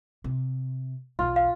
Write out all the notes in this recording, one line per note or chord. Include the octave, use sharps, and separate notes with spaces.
C3
B1 E2 F4
F5